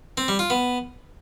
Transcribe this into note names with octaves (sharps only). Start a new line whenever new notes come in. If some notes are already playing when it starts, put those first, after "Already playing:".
C4
G3
F4
B3